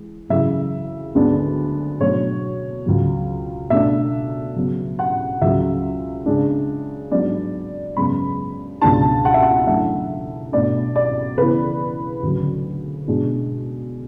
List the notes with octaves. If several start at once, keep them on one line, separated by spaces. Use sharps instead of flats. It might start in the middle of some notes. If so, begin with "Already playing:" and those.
Already playing: E3 G#3
F#2 C#3 E3 E5
D2 D3 G#3 B3 D4
B2 F#3 A3 D4 C#5
C#2 C#3 F#3
B2 A3 D4 E5
C#3 F#3 B3
F#5
C#2 C#3 F#3 C#4 E5
C#3 G#3 D4
G#2 F#3 B3 D4 D5
F#2 C#3 G#3 B3 B5
C#2 B2 G#3 D4 A5
F#5
E5
F#5
F#2 E3 A3 D4 E5
B2 A3 D4 D5
D5
C#3 E3 B3 B4
D2 C#3 F#3
B2 G#3 D4